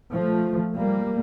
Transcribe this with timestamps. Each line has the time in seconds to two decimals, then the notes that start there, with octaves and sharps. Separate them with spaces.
0.12 F3 A3
0.75 G3 A#3